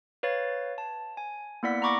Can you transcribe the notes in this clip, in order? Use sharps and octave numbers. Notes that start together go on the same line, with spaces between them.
B4 C#5 F5 A6
A5
G#5
A#3 B3 E4 D5 F#5 B6
A#5 B5 C#6 D6 A#6